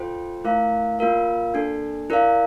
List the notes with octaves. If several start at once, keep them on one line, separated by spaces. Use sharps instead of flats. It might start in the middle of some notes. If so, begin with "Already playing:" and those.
Already playing: F4 A4 C5 G5
A3 E4 A#4 F5
A#3 F4 A#4 F5
A#3 D4 A4
E4 A#4 D5 F5